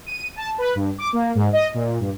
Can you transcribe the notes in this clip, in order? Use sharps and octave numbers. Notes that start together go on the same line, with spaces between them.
D#7
A5
B4
G2
D6
A#3
G#2
D#5
A#2
G2